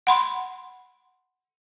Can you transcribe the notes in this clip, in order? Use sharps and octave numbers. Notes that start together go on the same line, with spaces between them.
F#5 B5 C6